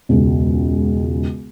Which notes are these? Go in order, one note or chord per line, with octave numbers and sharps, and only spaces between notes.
E1 C#2